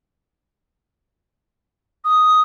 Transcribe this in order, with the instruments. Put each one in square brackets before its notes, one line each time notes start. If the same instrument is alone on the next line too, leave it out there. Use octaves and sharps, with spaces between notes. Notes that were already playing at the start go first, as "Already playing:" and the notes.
[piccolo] D#6